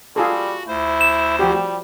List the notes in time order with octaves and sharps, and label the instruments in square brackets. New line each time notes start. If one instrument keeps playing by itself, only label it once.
[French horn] G3 [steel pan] F4 G#4 A4 [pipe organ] F#4
[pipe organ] D2 C5 [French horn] E4
[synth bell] E7
[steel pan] F3 F#4 G4 [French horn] G3